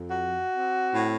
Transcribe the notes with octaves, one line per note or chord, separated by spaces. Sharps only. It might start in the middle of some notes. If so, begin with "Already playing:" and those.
Already playing: F2
F#4
C4
A2